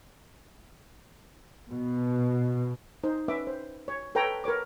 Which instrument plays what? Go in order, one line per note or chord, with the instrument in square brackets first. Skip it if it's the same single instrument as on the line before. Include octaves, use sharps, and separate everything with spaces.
[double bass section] B2
[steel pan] D#4 C5
C#4 B4 E5 D6
C5
C#5
A4 B4 C#5 G5 A#5
A#4 B4 C#5 D6